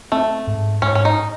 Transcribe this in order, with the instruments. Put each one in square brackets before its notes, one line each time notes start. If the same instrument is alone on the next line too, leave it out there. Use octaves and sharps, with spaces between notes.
[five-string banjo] A3 [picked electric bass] C4
[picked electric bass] G#2
[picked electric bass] G#2 [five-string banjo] C#4
[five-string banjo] C#4
D#4